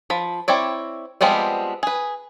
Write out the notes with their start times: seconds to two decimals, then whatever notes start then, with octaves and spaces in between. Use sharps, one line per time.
0.10 F3 B5
0.48 C4 E4 C#5 D5
1.21 F3 G3 G#3 B3 C4
1.83 G#4 B4